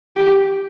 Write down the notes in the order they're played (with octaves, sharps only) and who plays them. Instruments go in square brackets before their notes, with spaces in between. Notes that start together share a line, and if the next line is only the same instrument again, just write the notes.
[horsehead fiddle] G4